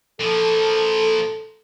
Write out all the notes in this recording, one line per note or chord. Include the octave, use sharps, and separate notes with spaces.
A#2 F3 A4